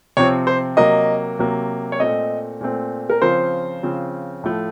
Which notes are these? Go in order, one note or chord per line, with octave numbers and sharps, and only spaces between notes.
C3 F3 C4 C#5
C5
C3 F#3 A#3 D#5
C3 F#3 A#3
C#5
A#2 A3 C4 D#5
A#2 A3 C4
A#4
C#3 F3 C4 C5
C#3 F3 C4
A2 F3 A3